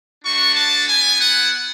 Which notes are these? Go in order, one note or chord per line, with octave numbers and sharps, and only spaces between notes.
A3 D4 F#4 C#6
A5
B3 E4 G#5
F#5